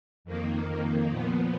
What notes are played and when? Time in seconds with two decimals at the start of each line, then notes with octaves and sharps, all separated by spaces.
0.25 F2 D#3 A#3
1.10 A#2 F3 B3